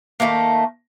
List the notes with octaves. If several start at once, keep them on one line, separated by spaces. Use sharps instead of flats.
D#3 G3 A3 A#3